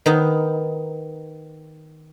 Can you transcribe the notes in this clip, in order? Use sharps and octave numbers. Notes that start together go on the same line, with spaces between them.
D#3 B3 D#4